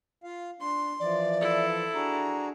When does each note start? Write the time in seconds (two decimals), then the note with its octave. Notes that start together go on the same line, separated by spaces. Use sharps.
0.24 F4 F5
0.60 D4 C6
1.00 E3 F3 D5
1.41 E4 A4
1.94 D4 F#4 G#4 A#5